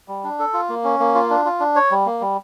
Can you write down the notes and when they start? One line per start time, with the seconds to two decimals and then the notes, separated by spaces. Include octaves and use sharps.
0.08 G3
0.24 D4
0.39 A4
0.54 F4
0.69 A#3
0.84 C#4
1.00 A#3
1.15 F4
1.30 D4
1.45 F4
1.60 D4
1.76 C#5
1.91 G3
2.06 A#3
2.21 G3